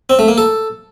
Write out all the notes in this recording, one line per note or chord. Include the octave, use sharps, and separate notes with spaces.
C4
A3
A#3
A4